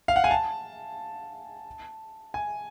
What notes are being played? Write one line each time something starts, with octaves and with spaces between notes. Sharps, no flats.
F5
F#5
G#5
A5
G#5